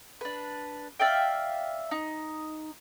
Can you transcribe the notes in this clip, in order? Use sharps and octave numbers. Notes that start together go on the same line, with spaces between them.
D4 B4
D5 E5 F5 G5
D#4